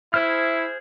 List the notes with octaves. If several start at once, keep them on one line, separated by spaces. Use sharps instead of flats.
E4 G#4 C5 F6